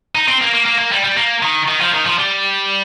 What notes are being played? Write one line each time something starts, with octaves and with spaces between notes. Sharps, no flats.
D#4
C4
A#3
A#3
A#3
A#3
G3
G3
A#3
D#3
D#3
F3
D#3
F3
G3